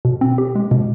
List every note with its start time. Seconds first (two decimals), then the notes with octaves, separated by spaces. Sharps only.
0.05 B2
0.21 C4
0.38 G4
0.55 G#3
0.71 B2